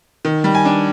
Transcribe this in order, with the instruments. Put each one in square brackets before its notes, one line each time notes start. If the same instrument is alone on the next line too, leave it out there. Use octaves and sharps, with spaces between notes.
[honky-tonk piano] D#3
G3
G#5
D4